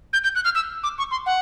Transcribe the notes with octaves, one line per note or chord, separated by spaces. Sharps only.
G6
G6
F#6
F6
E6
D6
C#6
C6
F#5